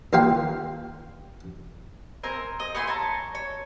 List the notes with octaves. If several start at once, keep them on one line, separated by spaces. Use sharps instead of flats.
D#2 F4 F5 G5 C6
C4 A#4 G#5
D#5
A3 E4 G#5 C6
C#5 A5 A#5
C#5